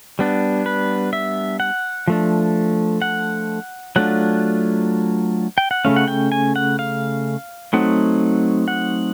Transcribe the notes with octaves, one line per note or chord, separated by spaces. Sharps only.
G3 B3 D4
B4
E5
F#5
F3 A3 D4
F#5
F#3 A3 D4 F4 F#5
G5
F#5
C#3 F3 A3 C#4 F5
F#5
G5
G#5
F#5
F5
F#3 A3 C4 D#4 F#5
F#5